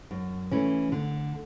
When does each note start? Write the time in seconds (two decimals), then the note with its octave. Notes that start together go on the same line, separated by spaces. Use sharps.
0.11 F#2
0.51 E3 A3 C#4
0.92 D3